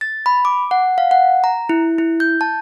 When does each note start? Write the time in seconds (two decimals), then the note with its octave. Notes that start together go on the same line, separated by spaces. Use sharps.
0.01 A6
0.26 B5
0.45 D6
0.71 F#5
0.98 F5
1.11 F#5
1.44 A#5
1.69 E4
1.98 E4
2.20 G6
2.41 A5